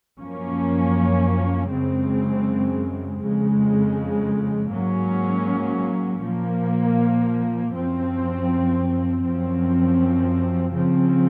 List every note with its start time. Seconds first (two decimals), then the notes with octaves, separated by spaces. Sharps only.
0.21 F#2 F3 A#3 C#4
1.70 F#2 C#3 G#3 C4
3.22 F2 C#3 G#3
4.72 G#2 F#3 A#3 C#4
6.23 A#2 F3 A#3
7.74 F#2 F3 C4
9.23 F#2 F3 C4
10.75 C#3 F3 C4